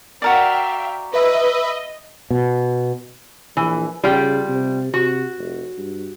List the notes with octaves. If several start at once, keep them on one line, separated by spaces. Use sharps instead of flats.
F#4 A#4 D5 E5 F5 G5
B4 D#5 E5
B2
A#1 E3
C#3 G3 F4 G5
C3
C3 F#4
F1
G2